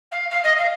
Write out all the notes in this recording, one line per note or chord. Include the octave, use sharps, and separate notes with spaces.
F5
F5
D#5
F5